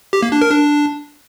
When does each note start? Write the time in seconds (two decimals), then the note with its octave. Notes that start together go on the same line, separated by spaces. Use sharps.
0.13 G4
0.22 A#3
0.32 D4
0.42 A#4
0.51 D4